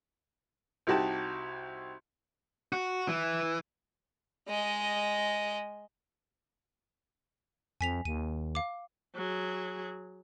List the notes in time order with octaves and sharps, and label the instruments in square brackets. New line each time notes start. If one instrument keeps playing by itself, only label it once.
[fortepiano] C2 D#4 F#4 G4 A5
[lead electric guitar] F#4
E3
[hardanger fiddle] G#3 D#5
[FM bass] F2 [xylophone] G#5 B6 F7
[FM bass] D#2 [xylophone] D#7
[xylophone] F5 D6
[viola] F#3 G#4